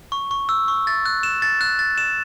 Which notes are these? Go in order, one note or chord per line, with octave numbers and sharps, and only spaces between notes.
C#6
C#6
E6
C#6
A6
F#6
E7
A6
F#6
A6
E7